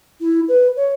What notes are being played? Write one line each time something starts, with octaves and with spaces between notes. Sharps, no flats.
E4
B4
C#5